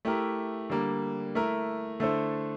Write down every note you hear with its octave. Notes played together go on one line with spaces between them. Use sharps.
A3 E4 G4 A#4
D3 G3 A#3
A3 E4 A#4
D3 A3 E4 A4 C5